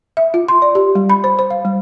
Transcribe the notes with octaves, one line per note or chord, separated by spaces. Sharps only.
E5
F4
C6
D5
G4
G3
B5
C5
C5
F5
G3